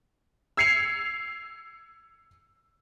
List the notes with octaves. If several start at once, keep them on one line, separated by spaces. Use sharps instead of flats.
E6 G#6 C7 C#7 F7